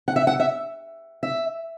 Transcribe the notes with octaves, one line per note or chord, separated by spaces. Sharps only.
F#5
E5
F#5
E5
E5